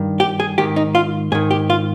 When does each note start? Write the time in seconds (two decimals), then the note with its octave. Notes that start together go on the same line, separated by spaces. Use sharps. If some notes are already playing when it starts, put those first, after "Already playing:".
Already playing: G2 D#3
0.20 G4
0.40 G#4
0.58 G#2 D#3 G4
0.76 D#4
0.95 F4
1.32 G#2 G#4
1.35 D#3
1.51 G4
1.70 F4